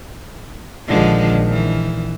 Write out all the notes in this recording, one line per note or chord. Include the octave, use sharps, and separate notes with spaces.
A#1 D3 D#3 F3 G#3
E3